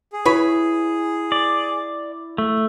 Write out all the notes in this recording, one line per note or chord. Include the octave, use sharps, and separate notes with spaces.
G#4
E4 B4 C#5 B5
D5
A3